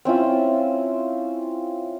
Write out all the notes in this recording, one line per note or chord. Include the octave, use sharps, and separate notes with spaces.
C4 C#4 E4 F4